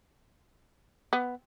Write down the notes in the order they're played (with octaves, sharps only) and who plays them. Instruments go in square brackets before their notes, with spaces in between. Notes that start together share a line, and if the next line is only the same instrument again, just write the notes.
[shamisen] B3